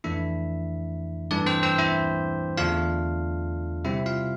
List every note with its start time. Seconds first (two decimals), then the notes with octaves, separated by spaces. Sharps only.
0.04 F2 E3 A3 D4 E4 E5
1.31 G2 E3 A3 D4 D5
1.46 C4 C5
1.63 C4 C5
1.78 E4 E5
2.57 E2 D3 A3 D4 F4 F5
3.85 C3 G3 C4 E4 E5
4.06 F4 F5